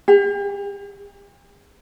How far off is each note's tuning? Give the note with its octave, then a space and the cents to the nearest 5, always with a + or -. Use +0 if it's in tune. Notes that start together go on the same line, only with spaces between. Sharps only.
G4 +40